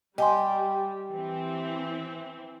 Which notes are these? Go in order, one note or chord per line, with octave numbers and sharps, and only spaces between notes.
G3 G4 D#5 G#5 C6
E3 C4